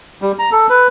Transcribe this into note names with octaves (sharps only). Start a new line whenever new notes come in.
G3
A#5
A4
B4